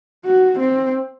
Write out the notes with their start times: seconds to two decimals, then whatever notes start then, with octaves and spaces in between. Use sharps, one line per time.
0.25 F#4
0.59 C4